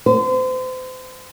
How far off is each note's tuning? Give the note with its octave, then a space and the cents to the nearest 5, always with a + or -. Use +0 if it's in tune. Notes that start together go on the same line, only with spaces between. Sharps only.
C5 -35